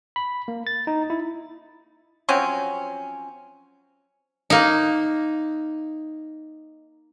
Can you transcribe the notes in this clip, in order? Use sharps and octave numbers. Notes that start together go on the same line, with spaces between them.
B5
A#3
A6
D#4
E4
F3 F#3 C4 C#4
A#3 D#4